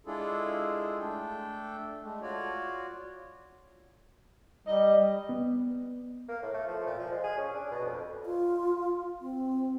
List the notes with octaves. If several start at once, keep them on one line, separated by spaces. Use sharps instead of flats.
G#3 D4 E4 F4 G#4 A4
A3 D4 A4 G5
G#3 A3
F4 F#4 C#5 D5
G3 D#5
B3
A#3
A2
A3
F3
A#2
F3
G#3
G#4
C#4
D4
B2
F2
F4
C4